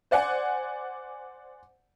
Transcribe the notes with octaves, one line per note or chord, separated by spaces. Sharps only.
C5 D5 F#5 G#5